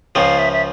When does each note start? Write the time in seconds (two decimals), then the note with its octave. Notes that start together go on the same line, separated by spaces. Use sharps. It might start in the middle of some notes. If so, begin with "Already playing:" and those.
0.15 C#2 C#3 F3 F5 G5
0.39 E5
0.53 E5